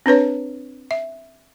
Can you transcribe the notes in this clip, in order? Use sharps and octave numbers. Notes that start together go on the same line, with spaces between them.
C4 D4 B4 C#5
E5